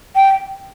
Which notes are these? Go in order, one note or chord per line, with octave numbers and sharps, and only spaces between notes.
G5